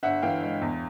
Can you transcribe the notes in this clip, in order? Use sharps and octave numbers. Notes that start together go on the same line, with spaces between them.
G1 E5 F#5
E3 F5 G5
G#3
E2